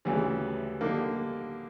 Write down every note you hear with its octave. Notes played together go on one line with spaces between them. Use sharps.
D2 C#3 E3 G3
D3 G3 A#3 D#4